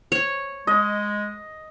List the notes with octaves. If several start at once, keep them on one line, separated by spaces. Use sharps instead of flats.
C#5
G#3 D#5